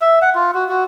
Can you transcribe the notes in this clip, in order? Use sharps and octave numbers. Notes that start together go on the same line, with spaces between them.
E5
F#5
F4
F#4
F#4